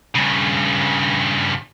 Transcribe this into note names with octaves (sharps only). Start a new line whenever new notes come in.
G2 C#3